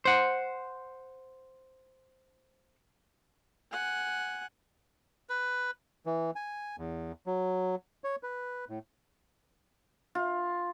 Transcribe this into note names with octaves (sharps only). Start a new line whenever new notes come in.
C5 F#5
F#5 G#5
B4
E3
G#5
E2
F#3
C#5
B4
A2
F4